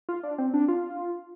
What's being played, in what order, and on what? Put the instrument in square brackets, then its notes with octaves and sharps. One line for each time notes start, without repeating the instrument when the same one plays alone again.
[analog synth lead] F4
D4
C4
D4
F4